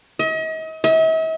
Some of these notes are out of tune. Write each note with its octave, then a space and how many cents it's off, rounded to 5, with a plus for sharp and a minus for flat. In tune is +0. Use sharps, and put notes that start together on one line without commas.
D#5 +40
E5 -45